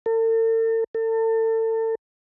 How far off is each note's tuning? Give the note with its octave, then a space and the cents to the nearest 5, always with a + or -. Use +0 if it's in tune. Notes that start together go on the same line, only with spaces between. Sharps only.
A4 +45
A4 +35